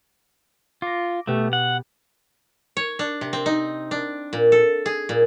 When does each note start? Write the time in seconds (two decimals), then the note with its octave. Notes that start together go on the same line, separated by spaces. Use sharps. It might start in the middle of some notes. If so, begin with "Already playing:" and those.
0.82 F4 D6 A#6
1.27 B2 A3 B3 G4
1.53 F#5
2.77 C#5
2.99 D4
3.21 C3
3.33 C4
3.46 D#4
3.91 D4
4.33 A#2
4.52 A4
4.86 G#4
5.09 A#2